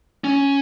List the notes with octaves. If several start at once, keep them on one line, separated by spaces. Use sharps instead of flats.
C#4